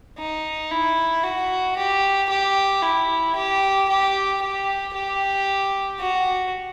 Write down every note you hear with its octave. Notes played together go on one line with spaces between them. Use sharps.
D#4
E4
F#4
G4
G4
E4
G4
G4
G4
G4
F#4